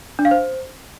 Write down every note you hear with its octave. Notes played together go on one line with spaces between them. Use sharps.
D4
F5
C5